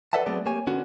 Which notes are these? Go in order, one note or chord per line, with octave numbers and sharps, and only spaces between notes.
A4 B4 D5 E5 F#5 A5
F#3 A3 B3 C4 G#4 D5
A#3 G4 C#5 G#5
D3 B3 C#4 F#4